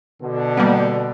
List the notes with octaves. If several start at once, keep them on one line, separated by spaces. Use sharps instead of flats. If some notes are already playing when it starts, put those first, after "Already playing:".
B2 D3
G3 A#3 B3